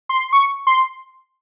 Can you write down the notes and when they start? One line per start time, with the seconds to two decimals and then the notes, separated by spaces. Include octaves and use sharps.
0.09 C6
0.33 C#6
0.67 C6